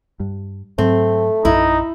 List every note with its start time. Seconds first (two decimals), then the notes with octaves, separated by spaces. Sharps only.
0.20 G2
0.78 G#2 F#3 A3 C4
1.45 A#1 F#2 D#4 E4